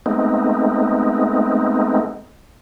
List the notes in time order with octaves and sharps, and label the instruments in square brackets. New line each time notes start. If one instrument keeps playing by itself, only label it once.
[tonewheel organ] G#3 A3 B3 C4 D#4